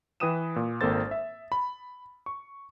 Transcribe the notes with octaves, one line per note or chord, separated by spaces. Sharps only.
E3 B4 G5 D#6 D#7 E7
A#2
G#1 A#3 C4 A4 C5 A6
E5
B5
C#6